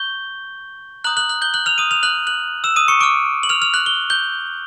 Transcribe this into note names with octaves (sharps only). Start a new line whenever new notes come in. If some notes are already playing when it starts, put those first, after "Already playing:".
Already playing: C#6 G6 G7
A#5 D#6 F#6 G6 F#7
F#6 F#7
F#6 F#7
G6 G7
F#6 F#7
F6 F7
D#6 D#7
F6 F7
F#6 F#7
F#6 F#7
E6 E7
D#6 D#7
C#6 C#7
C#6 D6 F6 D7
F#7
F6 F7
F6 F7
F#6 F#7
G7
G6 G7